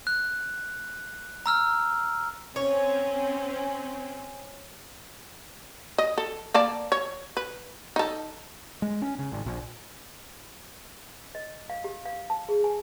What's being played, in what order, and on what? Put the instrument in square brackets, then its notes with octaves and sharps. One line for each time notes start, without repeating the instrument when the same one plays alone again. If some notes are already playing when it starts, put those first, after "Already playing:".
[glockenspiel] F#6
A#5 E6 F6
[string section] C4 C#4 [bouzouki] C#5
[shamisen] D#5
A4
A#3 D5 A5
C#5
B4
D#4 A4
[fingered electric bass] G#3
C#4
C#3
G#1
A#1
[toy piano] D#5
F5
G4
F5
A5
G#4
G#5